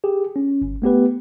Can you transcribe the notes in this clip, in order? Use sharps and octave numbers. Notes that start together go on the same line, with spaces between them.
G4 G#4
C#4
G1
A3 B3 G4 B4